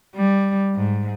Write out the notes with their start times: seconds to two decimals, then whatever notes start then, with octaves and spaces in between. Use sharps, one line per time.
0.16 G3
0.75 G#2